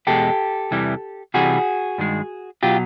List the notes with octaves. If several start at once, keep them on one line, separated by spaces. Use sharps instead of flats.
E2 B2 G#3 G4 A4
E2 C3 E3 G3
C2 C3 E3 G3 F#4 G#4
G2 D#3 G#3
B2 F#3 F4 G4